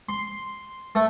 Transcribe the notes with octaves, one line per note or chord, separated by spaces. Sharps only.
C6
A3